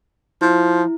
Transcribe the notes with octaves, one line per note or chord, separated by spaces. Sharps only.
F3 E4